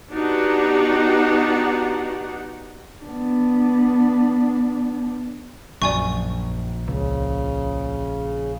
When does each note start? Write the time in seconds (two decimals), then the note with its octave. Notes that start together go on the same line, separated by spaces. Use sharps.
0.13 B3 D4 D#4 F#4 G4 F#5
3.03 B3 D4
5.82 A#1 F#2 D5 G#5 C#6
6.88 C#2 C#3